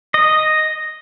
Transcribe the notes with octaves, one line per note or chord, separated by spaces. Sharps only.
D#5